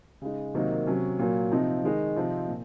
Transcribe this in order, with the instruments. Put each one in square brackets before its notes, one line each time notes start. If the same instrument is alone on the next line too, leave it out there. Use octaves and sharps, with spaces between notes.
[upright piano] C#3 G#3 D#4
C3 D#3 F#3 A#3 D#4
C3 F#3 C#4
A#2 F#3 A#3
C3 F3 C4 D#4
D#3 G#3 D#4
C3 F3 C4 D#4
A#2